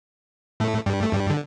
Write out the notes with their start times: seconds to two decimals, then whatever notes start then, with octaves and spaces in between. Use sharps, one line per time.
0.60 A2 A3
0.86 G2 G3
1.03 A3
1.13 G2 G3
1.30 D3